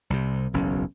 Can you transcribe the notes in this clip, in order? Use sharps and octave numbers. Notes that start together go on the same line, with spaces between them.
C2 C3
F#1 B1 E2 C#4